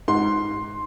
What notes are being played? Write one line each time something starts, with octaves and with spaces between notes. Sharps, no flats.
G#2 C6